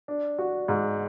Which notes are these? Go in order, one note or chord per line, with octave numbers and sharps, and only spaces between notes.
D4
F#4
G#2